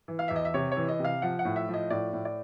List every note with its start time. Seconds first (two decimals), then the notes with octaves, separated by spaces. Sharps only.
0.08 E3
0.19 F5
0.28 E2 E5
0.36 D#5
0.45 E5
0.54 C3 C#5
0.71 C#5
0.77 E3
0.88 D#5
0.99 C3
1.05 F5
1.22 F3 F#5
1.39 F#5
1.45 A2
1.56 E5
1.68 F3
1.74 D#5
1.91 A2 D5
2.13 A2
2.25 D5